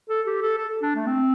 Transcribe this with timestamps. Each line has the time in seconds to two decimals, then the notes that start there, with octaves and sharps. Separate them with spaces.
0.09 A4
0.26 G4
0.42 A4
0.58 A4
0.82 D4
0.95 A3
1.06 C4